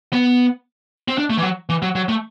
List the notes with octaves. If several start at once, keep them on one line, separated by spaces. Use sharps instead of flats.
B3
C4
D4
A3
E3
F#3
E3
F#3
F#3
A3